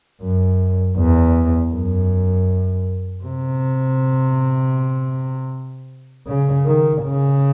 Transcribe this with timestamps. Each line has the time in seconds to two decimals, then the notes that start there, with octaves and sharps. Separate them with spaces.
0.21 F#2
0.97 E2
1.73 F#2
3.24 C3
6.27 C#3
6.66 D#3
7.03 C#3